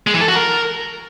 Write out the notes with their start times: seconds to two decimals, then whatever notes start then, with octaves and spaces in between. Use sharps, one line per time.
0.07 G#3
0.14 E3
0.21 A4
0.28 F#4
0.35 A#4